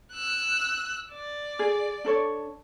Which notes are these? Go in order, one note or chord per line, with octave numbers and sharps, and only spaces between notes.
E6 F#6
D5
G#4
D4 A4 C#5